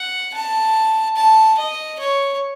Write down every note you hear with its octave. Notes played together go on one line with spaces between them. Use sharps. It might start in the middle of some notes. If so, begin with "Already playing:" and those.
Already playing: F#5
A5
A5
D#5
C#5